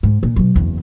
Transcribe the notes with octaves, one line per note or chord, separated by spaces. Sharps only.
G#2
A#2
B2 F#3
F#1 E2